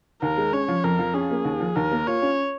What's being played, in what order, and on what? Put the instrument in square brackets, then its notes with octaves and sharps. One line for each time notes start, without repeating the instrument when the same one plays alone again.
[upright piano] D#2 [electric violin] A#4
[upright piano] G#3
[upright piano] C#4 [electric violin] C#5
[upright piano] F3
[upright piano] F2 [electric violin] A#4
[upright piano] F3
[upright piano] C#4 [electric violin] G#4
[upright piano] A#3
D#2
F3
[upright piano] D#2 [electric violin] A#4
[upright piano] A#3
[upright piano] F4 [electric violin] C#5
[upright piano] C#4